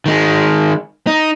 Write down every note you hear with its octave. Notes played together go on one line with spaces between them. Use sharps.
D#3 G#3
D#4